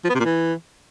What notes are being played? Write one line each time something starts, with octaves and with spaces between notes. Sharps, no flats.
F3
B3
C3
A#2
E3